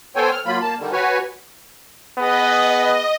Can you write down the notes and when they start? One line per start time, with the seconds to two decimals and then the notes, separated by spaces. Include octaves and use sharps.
0.16 B3 A4 C5 C#5 G5 G#5
0.31 F6
0.46 F#3 A#3 F4 B5
0.62 A#3 A5
0.79 D3 D#3 G3
0.93 F#4 B4 C#5 G#5
2.18 B3 G#4 B4 D#5